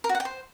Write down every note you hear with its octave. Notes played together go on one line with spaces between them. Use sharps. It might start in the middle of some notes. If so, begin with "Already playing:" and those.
A#4
F#4
F#5
G5
C5